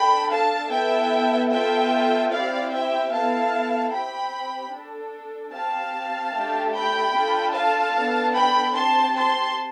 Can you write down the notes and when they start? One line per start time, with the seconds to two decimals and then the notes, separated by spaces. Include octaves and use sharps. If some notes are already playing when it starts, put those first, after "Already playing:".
Already playing: D4 A4 G5 B5
0.30 F5 A5
0.70 B3 E4 A4 E5 G5
1.51 B3 F4 A4 E5 G5
2.31 C4 E4 G4 D5 F5
2.72 E5 G5
3.12 B3 E4 A4 F5 A5
3.92 C4 G4 G5 B5
4.73 D4 A4
5.53 C4 G4 F5 A5
6.34 A3 D4 G4
6.74 G5 B5
7.14 D4 F4 A4
7.55 F5 A5
7.96 B3 D4 A4
8.35 G5 B5
8.75 C4 G4 A5 C6
9.15 A5 C6